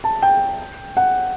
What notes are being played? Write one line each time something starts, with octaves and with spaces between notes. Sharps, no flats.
A5
G5
F#5